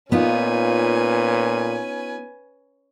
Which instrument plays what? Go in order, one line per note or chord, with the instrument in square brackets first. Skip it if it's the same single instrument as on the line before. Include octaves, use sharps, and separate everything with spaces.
[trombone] A#2 [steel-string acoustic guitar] B3 D#4 F4 [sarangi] C#4 [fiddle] B4 G#5